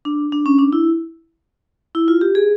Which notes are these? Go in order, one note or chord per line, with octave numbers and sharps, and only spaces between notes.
D4
D4
C#4
D4
E4
E4
F4
G4
G#4